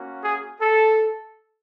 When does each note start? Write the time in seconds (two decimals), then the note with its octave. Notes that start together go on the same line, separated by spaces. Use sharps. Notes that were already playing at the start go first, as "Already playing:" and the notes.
Already playing: A#3 C#4 F#4
0.23 G#4
0.61 A4